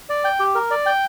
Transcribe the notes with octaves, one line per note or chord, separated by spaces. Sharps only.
D5
G5
G4
A#4
D5
G5